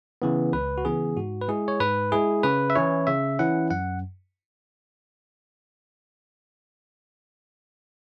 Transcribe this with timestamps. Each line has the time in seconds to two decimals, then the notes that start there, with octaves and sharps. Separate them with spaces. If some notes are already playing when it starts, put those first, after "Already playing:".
0.22 C#3 E3 B3
0.53 C#2 B4
0.78 F#4
0.85 C#3 E3 B3 G#4
1.17 G#2 F#4
1.42 B4
1.48 G#3 E4 G#4
1.68 C#5
1.80 G#2 B4
2.12 G#3 E4 G#4
2.43 C#3 B4
2.70 E5
2.76 E3 C#4 E4 C#5
3.07 C#3 E5
3.39 E3 C#4 E4 F#5
3.70 F#2 F#5